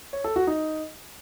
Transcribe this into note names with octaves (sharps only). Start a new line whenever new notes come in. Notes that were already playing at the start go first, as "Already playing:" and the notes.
C#5
A4
F#4
D#4